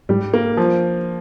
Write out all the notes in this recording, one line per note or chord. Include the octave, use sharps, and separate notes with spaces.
G#2 G3
A#3
F3